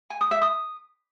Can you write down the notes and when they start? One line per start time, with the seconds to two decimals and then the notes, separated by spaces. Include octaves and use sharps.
0.10 G#5
0.21 D#6
0.31 E5
0.42 D#6